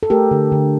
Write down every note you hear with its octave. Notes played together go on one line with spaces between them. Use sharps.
A4
A3 G4 A#4
D3
D3